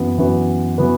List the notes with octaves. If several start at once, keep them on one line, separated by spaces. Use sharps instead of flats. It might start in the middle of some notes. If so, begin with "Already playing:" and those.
Already playing: F#2 E3 B3 F#4
F#2 E3 B3 F#4 B4
E3 B3 F#4 B4